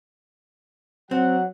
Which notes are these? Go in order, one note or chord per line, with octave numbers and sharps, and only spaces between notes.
F#3 C4 F#5